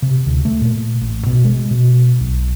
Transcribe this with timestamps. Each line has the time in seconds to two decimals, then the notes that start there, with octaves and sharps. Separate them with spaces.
0.02 C3
0.26 D2
0.45 A3
0.61 A#2
1.01 A1
1.26 B2
1.45 G#3
1.71 B2
2.20 B1